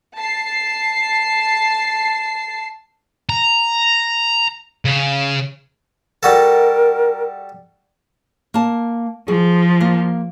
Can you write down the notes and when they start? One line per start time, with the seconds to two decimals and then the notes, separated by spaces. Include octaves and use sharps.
0.17 A5 C7
3.29 A#5
4.85 C#3
6.23 G3 F#4 A4 A#4
8.54 A#3 A5
9.28 F3 G#4
9.81 A#3